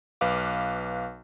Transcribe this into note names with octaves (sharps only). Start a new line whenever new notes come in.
B1 B4 F5 D6